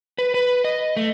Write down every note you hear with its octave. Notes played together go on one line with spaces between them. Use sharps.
B4
B4
D#5
A3